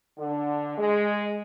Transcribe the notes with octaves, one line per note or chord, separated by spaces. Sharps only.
D3
G#3